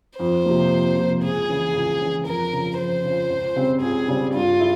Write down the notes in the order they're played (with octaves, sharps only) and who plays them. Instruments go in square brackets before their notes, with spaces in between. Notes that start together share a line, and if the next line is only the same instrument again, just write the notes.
[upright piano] F2 [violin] C5
[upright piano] C3 F3 A#3
F2
C3 F3 A#3
[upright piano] C#2 [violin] G#4
[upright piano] C#3 E3
C#2
C#3 E3
[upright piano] F2 [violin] A#4
[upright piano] C#3 F3
[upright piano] F2 [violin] C5
[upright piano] C#3 F3
C#2
C#3 G3 C4
[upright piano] C#2 [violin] G#4
[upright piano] C#3 G3 C4
[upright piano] G2 [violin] F4
[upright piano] E4 G#4